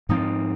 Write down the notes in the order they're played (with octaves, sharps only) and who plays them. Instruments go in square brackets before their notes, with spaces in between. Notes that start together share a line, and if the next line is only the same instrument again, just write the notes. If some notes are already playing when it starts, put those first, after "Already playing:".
[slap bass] G#2 F3 C4 [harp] D#4